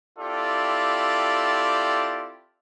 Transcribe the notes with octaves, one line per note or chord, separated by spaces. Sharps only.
C4 E4 F4 G4 A4 D5